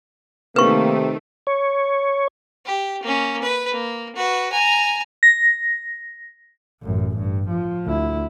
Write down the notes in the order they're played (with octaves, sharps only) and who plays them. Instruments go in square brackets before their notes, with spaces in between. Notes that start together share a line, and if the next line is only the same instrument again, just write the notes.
[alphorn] C3 [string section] D#3 A3 [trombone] A#3 [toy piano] B4 C#6
[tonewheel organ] C#5
[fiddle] G4
A#3 C#4
B4
A#3
F#4 B4
G#5 A#5
[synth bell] A#6
[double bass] A1 F#2
G2
F3
D2 E4